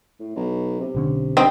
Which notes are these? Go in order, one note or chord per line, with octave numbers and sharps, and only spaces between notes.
A2
B1
C3
B1 D3 C#4
G2 C4 D#4